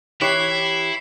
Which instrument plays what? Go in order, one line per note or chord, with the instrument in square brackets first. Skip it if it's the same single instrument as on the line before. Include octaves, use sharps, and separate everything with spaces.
[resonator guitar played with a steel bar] E3 G4 C#5 [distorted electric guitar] E4 [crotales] B6 C7